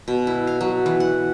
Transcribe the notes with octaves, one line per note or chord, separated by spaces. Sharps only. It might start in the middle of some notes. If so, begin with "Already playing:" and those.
B2
E4
F5
F#3
E3
F#5